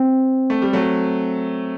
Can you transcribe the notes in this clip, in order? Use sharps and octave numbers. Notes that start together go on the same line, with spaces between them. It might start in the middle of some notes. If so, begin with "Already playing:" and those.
Already playing: C4
A3
G3
F#3 A3